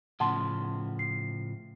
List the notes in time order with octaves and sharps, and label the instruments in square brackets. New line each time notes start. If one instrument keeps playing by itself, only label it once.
[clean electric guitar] A2 C#3 F3 [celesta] F#5 A5 C6
[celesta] C7